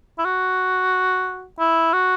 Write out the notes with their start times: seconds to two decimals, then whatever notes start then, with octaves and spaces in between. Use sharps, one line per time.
0.19 E4
0.25 F#4
1.59 E4
1.93 F#4